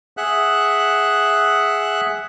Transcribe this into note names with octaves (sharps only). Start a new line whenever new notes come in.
G#4 E5 F#5 F#6